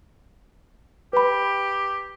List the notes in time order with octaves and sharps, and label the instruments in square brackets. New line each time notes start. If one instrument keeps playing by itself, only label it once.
[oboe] G4 [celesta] B4 B5